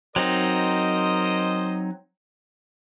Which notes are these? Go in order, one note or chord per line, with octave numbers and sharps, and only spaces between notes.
F#3 C4 D#4 A#4 C5 D#5